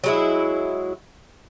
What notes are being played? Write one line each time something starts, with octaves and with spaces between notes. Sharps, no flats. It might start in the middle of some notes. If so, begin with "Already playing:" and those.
F#3 G#3 E4